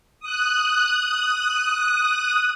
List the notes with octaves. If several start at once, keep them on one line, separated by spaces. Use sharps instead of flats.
D#6 F#6